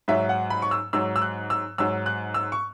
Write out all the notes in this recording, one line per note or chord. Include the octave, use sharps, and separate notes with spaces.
G#2 F#3 E5
F#5
B5
C#6
E6
G#2 F#3 E6
E6
F#6
E6
G#2 F#3 E6
F#6
E6
C#6